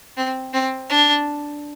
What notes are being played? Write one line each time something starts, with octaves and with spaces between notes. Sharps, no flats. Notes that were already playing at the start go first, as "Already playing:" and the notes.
C4
C4
D4